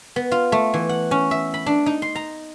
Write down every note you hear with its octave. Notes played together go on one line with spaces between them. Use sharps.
B3
F4
A3
E3
F#5
C#4
E5
B5
D4
D#4
C6
A#5